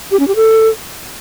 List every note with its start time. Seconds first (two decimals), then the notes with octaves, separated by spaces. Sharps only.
0.11 G4
0.19 C#4
0.28 G4
0.36 A4